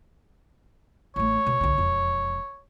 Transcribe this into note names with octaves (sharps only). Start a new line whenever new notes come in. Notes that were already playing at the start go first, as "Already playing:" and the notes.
A1 A3 C#5
C#2 B2
B1 D3
E1 F2